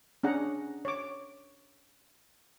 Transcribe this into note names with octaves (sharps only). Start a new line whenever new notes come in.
C#4 D4 G#4 F#5 A#5
C#5 D6